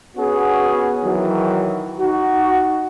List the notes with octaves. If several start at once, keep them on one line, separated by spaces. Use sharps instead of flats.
B3 C#4 F#4 G#4
D#3 E3 F#3
D#4 F#4